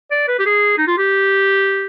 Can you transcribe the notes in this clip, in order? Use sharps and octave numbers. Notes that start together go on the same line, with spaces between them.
D5
B4
G4
G#4
D#4
F4
G4